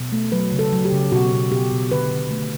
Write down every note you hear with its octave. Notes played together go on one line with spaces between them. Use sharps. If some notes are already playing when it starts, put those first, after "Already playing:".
Already playing: B2
A3
F#3 B4
C#3
A4
F#3
G4
C#3
B2 F#4
B2
B2 G4
B2
D3 B4
D3
A3